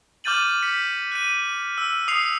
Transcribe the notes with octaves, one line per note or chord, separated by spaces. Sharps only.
D6 F6 G6 A6 D#7 F#7
B6 C#7
F#6 D#7
E6
D#6 C7 C#7 F7